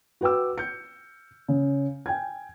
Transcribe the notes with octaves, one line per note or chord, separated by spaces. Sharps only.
F#4 B4 G5 D6 E6
G6 C#7
C#3
G5 G#5 G#6